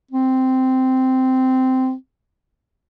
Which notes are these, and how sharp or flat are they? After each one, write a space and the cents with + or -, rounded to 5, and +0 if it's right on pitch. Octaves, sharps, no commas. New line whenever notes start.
C4 -10